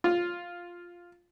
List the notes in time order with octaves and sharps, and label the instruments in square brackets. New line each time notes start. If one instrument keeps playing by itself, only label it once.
[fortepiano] F4